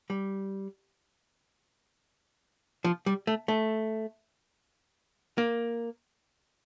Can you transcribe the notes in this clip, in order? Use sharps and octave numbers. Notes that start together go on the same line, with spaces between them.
G3
F3
G3
A3
A3
A#3